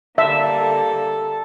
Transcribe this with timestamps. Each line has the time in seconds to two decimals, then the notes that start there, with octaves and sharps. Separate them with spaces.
0.18 D3 G3 A#3 E5 A5
0.62 A4